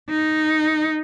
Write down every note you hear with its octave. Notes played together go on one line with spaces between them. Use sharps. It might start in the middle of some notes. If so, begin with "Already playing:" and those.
D#4